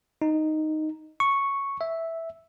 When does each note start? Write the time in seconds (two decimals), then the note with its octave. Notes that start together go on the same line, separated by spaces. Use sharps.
0.22 D#4
1.20 C#6
1.81 E5